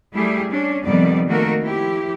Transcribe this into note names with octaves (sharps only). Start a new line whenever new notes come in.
G3 A3 E4 G4 G#4
C#4 D4
F2 C3 D#3 G3 B3 D5
D#3 A3 A#3 F#4 A#4
F3 E4 G4